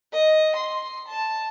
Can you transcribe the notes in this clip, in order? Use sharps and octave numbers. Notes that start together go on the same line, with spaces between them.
D#5
C6
A5